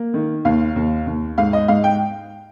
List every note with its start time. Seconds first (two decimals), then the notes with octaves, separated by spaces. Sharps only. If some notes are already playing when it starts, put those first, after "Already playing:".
Already playing: A#3
0.14 D#3
0.45 D#2 F5
0.76 D#2
1.06 D#2
1.38 G#2 F5
1.53 D#5
1.68 G#2 F5
1.84 G5